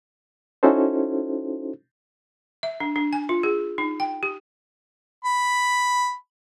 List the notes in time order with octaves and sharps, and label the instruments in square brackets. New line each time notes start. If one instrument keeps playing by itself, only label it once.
[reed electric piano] C#4 D#4 E4 F#4 A4 C5
[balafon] E5
D4
D4
G#5
F4
G#4
D#4
G5
G4
[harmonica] B5